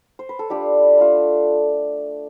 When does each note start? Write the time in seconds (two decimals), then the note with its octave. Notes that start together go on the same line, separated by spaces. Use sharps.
0.19 C5
0.29 B4
0.39 A4
0.50 G3 D4 F4 G4
0.98 A3 D4 F4